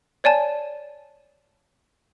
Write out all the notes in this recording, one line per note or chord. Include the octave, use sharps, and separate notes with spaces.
C#5 D5 G#5 A5